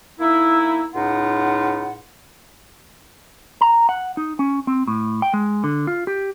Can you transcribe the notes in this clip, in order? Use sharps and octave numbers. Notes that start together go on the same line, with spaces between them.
A#3 D#4 E4
C#2 A2 D#4 F4 F#5
A#5
F#5
D#4
C#4
C4
A2
G5
G#3
D3
F4
G4